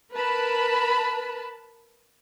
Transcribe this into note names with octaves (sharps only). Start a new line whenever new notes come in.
A#4 B4 A5 B5